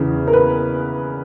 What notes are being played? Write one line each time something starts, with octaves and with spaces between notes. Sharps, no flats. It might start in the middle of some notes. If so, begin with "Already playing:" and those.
Already playing: E2 C#3 E3
A#4
B4